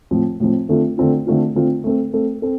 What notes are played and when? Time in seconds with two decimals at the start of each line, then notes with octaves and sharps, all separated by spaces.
0.11 A2 F3 C4
0.40 A2 F3 C4
0.69 D3 A3 C4 F4
0.98 D3 A3 C4 F4
1.27 D3 A3 C4 F4
1.55 D3 A3 C4 F4
1.84 A3 C4 A4
2.13 A3 C4 A4
2.42 C4 A4